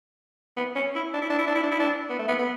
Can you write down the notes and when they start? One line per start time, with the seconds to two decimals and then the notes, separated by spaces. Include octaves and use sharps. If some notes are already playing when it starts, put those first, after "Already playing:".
0.57 B3
0.76 C#4
0.95 E4
1.14 D4
1.22 E4
1.30 D4
1.38 E4
1.47 D4
1.55 E4
1.63 D4
1.72 E4
1.79 D4
2.10 B3
2.19 A3
2.28 B3
2.39 B3